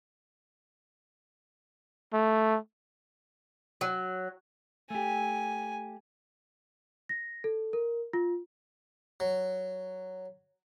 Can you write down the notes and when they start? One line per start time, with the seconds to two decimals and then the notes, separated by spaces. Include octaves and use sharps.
2.13 A3
3.81 F#3
4.90 A3 G4 G#5
7.09 A#6
7.44 A4
7.73 A#4
8.13 F4
9.20 F#3